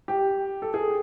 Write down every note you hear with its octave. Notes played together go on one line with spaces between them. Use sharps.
G4
A4
G#4